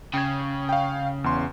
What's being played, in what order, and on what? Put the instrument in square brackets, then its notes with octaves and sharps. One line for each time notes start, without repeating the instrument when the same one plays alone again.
[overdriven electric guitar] C#3 [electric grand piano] G5 G#6
[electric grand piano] F5 G5
E2 C6